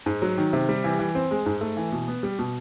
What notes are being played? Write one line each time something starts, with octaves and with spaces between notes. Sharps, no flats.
G#2
F#3
D#3
C3
G3
E3
E3
C4
G#3
G#2
A3
E3
B2
B3
G3
B2